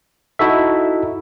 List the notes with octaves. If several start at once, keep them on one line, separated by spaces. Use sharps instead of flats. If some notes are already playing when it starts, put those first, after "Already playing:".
D#4 E4 F#4 A4 E5